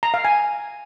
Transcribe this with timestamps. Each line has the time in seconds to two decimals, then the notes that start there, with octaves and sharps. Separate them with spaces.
0.03 A#5
0.14 F5
0.25 G#5